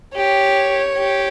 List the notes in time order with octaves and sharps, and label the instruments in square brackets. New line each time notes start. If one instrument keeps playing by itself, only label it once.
[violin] G4 [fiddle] C#5
[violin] G4